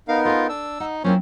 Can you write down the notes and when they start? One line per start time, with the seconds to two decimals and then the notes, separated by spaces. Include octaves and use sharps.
0.08 B3 D#4 A#4 F5
0.25 F4 A4 G#5
0.49 D4 E6
0.80 D#4 F#5
1.04 F#3 A#3 C4 C#4 E4 F4 C5